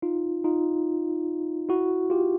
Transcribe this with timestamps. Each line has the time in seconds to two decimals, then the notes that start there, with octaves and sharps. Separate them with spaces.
0.02 D#4 F4
0.44 D#4 F4
1.69 E4 F#4
2.10 F4 G4